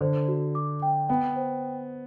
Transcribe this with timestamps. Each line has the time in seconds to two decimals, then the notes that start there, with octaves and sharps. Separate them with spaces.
0.01 D3 C5
0.28 F#4
0.55 D6
0.82 G5
1.09 B3 G5
1.36 C5